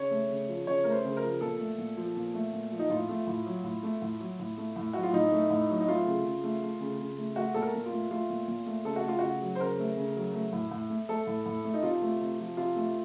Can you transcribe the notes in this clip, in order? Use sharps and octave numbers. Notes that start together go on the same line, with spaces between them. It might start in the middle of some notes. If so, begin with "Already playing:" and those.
Already playing: C#3 C#5
A3
C#3
F3
C#3 C#5
A3 A#4
C5
C#3
A#4
F3
A#2 A4
A3
A#2
F3
A#2
A3
A#2
F3
D#4
A2 F4
A3
A2
F#3
A2
A3
A2
F#3
A2
A3
A2
F#3 F#4
F4
A2 D#4
A3
A2
F#3
D#4
A3 F4
C#3
C#3
A3
A3
C#3
C#3
A3
A3 F#4
A#2 A4
A#4
A#2
F4
A3
A3 F4
A#2
A#2
A3
C#3 A4
F#4
A3 F4
C#3 F#4
F#3
C5
C#3 A#4
A3
C#3
F#3
A3
A2
A2
A3
A3 A4
A2
A2
A3
D#4
C3 F4
A3
C3
F3
C3 F4
A3